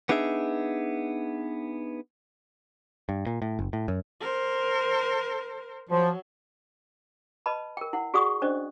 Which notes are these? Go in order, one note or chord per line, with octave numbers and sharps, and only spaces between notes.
B3 D4 D#4 G#4 E5
G2
A#2
A2
F#1
A2
F#2
A#4 C5
F3 F#3
B4 D#5 A5 B5
A#4 G5
E4 F#5
F#4 G#4 D5 F#5 C#6 D#6
C#4 D4 C5 D5 D#5